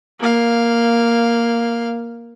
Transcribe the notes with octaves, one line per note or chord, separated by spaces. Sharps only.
A#3 F5